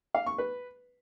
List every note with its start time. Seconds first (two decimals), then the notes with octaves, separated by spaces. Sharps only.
0.15 F5
0.26 C#6
0.38 B4